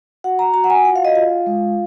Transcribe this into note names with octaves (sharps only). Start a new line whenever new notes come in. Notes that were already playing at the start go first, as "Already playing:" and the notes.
F#4 F#5
A#5
F#4 A#5
F#5
G#5
F4 F#5
F5
D#5
F4 F5
G#3